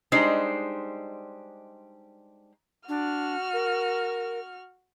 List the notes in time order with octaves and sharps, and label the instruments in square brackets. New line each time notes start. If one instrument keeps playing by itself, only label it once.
[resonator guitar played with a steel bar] G3 G#3 D4 D#4 C5
[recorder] D4 [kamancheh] F#4 F6
[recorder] A#4